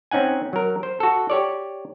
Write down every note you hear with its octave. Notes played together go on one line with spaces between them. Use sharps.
C4 C#4 D#4 F#5 G#5
F#3 A#4
C5
F#4 A4
G4 C#5 D5